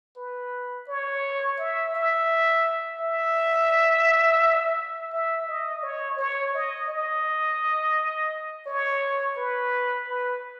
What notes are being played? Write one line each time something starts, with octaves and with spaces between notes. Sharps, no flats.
B4
C#5
E5
E5
E5
E5
D#5
C#5
C#5
D#5
D#5
C#5
B4
B4